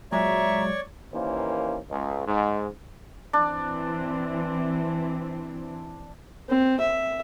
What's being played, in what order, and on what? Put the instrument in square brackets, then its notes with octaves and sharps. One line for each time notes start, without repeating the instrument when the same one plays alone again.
[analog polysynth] A#2 F#3 G#3 [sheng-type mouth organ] C#5 D5 C#6 [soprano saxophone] E5 [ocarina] A#5
[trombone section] D#2 E3 A#3 C#4 C5
C#2
G#2
[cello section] E3 C4 E4 [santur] D4
[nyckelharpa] C4
E5